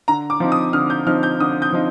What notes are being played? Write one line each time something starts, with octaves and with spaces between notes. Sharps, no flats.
D3 A#5
D6
F3 C4 D#4
D#6
D3 F6
G6
F3 C4 D#4 F6
G6
D3 D#6
G6
F3 C4 D#4